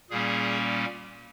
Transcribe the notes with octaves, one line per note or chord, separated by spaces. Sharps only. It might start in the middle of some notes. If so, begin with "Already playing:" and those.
A#2 G3 A#3 C#4 G#4